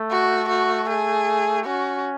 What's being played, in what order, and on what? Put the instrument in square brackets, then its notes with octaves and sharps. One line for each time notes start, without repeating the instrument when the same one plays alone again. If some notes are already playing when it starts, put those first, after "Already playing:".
Already playing: [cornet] A3
[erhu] F#4
F#4
G#4
[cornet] C#4 [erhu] F#4